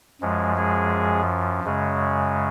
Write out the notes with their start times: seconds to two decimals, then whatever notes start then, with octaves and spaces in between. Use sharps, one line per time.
0.21 F#2 F3 G#3
0.57 G#3 G#4
1.64 F#2 C#3 G#3